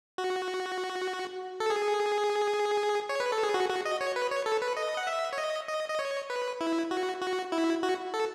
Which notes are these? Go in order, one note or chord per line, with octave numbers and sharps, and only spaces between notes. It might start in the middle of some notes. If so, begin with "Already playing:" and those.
F#4
A4
G#4
C#5
B4
A4
G#4
F#4
F#4
D#5
C#5
B4
C#5
A4
B4
D#5
F#5
E5
C#5
D#5
D#5
D#5
C#5
B4
E4
F#4
F#4
E4
F#4
A4